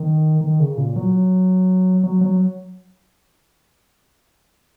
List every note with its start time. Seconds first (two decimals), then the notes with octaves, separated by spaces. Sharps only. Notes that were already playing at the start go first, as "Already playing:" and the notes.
Already playing: D#3
0.41 D#3
0.60 C#3
0.77 A#2
0.96 F#3
2.03 F#3
2.21 F#3